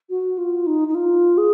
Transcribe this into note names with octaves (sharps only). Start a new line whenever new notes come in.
F#4
F4
D#4
D#4
F4
G#4